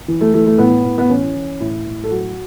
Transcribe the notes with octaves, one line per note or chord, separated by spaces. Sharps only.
E3
A3
E3 A3
A3
A2 B3
A2
B3
E3 C#4
E3
A2 E4
A2
A4
F#3 F#4